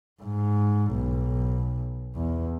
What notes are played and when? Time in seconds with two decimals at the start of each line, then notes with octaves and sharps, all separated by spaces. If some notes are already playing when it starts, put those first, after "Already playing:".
0.22 G#2
0.93 B1
2.16 E2